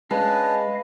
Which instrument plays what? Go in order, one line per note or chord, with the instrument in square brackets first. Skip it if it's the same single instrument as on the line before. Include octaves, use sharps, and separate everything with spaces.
[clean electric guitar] G#3 [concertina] C#4 D4 A5 [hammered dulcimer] B4 [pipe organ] D#5 F5